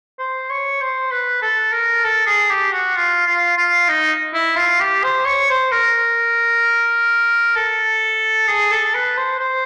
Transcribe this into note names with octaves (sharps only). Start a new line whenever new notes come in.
C5
C#5
C5
B4
A4
A#4
A4
G#4
G4
F#4
F4
F4
F4
D#4
E4
F4
G4
C5
C#5
C5
A#4
A4
G#4
A4
B4
C5
C5